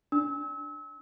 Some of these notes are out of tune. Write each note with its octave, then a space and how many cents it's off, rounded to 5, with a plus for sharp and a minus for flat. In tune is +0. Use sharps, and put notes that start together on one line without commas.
D4 +0 E6 -35